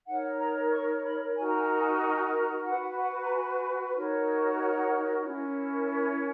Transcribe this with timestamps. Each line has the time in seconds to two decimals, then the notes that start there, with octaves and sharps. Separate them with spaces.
0.06 D#4 A#4 C#5 F#5
0.39 A#5
0.72 C#6
1.03 B5
1.36 D#4 F#4 A#4 G#5
1.47 A#5
1.57 G#5
1.68 A#5
1.79 G#5
2.00 G#5
2.07 A#5
2.14 G#5
2.33 A#5
2.65 F#4 B4 F#5
2.97 F#5
3.24 A#5
3.29 G#5
3.93 D#4 F#4 A#4 C#5
4.58 F#5
5.23 C#4 E4 A#4
5.87 C#5